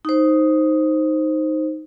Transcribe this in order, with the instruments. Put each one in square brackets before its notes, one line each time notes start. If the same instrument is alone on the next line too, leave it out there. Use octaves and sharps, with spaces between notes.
[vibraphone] D#4 C5